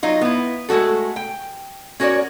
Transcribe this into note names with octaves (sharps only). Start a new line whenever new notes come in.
F#3 D#4 F4
B3 E4
G#3 A3 C4 F#4 A4
G5
C#4 F#4 A#4 C#5 D5